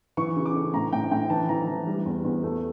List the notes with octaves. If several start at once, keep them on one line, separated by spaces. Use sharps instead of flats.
E3 C#6
C#3
D6
A3
A2 A#5
A2 G5
A2 G5
E3 A5
E3 A#5
E3
G3
E2
E2
A3